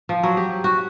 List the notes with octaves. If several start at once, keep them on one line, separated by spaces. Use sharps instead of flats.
F3
F#3
G4
F#4